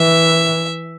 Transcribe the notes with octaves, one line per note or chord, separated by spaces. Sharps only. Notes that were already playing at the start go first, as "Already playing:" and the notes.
Already playing: E3 E5